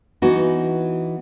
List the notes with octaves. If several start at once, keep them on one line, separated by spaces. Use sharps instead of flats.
E3 B3 D#4 F#4